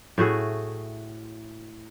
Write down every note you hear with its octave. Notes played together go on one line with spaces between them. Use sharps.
A2 A3 F#4 G#4